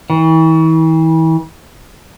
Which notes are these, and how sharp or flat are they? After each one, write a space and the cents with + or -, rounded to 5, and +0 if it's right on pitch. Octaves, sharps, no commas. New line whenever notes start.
E3 -40